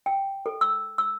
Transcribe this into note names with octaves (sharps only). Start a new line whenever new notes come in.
G5
A4
E6
E6